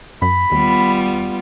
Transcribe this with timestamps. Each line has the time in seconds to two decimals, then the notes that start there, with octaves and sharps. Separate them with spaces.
0.22 F#2 B5
0.52 D#2 G3 B3 F4